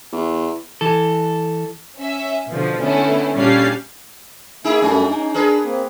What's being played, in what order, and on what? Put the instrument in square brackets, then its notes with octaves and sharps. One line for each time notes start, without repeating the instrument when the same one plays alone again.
[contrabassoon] E2
[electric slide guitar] E3 A4
[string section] C#4 E5
B2 D3 F3
D3 A3 B3 C#4 E4
A#2 G3 C#4 D4 F5 C7
[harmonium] A#3 E5 [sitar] D#4 E4 G#4
[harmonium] F#2 G3 A3 [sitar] A#3 C#4
[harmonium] D#4
[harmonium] D4 [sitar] G#4 A#4 B4
[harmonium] A#3 C4